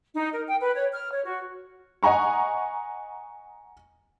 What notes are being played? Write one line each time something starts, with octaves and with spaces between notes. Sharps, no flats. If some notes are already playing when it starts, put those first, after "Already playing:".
D#4
A#4
G5
B4
C#5
F6
C#5
F#4
D#5 F#5 G#5 A#5 C#6